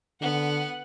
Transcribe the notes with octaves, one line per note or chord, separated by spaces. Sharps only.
D3 B3 F#5